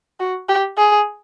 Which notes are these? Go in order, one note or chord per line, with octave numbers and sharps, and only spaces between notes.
F#4
G4
G#4